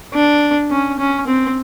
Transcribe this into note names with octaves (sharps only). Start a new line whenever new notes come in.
D4
C#4
C#4
C4